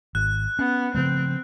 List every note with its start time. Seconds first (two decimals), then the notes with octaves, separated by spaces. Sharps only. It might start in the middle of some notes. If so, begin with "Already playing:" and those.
0.15 G#1 F#6
0.59 B3 C#4
0.95 C#3 F3 A3 C4